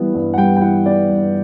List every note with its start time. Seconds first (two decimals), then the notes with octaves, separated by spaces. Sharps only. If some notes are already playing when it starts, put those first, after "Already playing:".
Already playing: E3 G3 B3
0.14 G2
0.34 F#5
0.38 G3 G5
0.57 G5
0.61 E3 F#5
0.85 B3 D5
1.09 G2